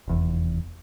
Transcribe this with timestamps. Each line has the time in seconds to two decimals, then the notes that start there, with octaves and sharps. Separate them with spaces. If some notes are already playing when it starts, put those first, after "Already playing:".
0.08 F1 E2